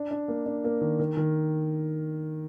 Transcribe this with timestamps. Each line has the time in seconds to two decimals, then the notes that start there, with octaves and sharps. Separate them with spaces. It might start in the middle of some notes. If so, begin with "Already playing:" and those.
Already playing: D4
0.11 D4
0.28 A#3
0.46 D4
0.64 A#3
0.81 D#3
0.99 D#3
1.17 D#3